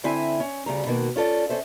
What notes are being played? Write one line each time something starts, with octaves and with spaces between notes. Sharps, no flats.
D3 C4 E4 E5 G#5
C#4
D2 C#3 G3 A#5
B2 D#3 A#3 F#4
C#4 F4 A4 D5
C#4 A4 C5 E5